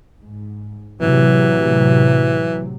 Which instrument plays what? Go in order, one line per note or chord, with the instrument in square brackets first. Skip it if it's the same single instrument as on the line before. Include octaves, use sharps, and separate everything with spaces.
[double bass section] G#2
[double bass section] A2 C3 F#3 [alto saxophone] E3